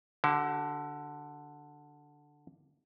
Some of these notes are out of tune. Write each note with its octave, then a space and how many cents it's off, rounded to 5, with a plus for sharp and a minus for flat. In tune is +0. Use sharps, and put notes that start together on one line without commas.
D3 +0 F#4 +45